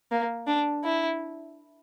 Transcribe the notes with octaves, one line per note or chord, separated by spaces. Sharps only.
A#3
D4
E4